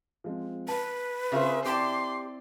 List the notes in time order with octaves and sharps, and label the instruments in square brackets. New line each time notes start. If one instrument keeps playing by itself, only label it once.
[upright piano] F3 G#3 C4
[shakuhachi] B4 [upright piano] A5
[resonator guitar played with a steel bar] C#3 G#4 C5 [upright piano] C4 F4 A#4 [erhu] E5
[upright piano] C4 E4 D5 [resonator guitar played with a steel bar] G4 A5 [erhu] C6 [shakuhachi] D6